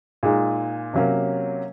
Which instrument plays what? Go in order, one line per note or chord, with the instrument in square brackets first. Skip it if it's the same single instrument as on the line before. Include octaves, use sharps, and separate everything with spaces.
[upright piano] A#2 G#3 D#4
C3 F#3 A#3 C#4